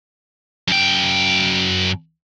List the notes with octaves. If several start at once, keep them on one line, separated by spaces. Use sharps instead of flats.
F#2 G5